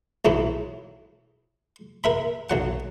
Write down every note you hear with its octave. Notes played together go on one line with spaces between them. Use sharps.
B1 G#2 F#3 E4
A#4 E5 B5
B1 F#3 F#5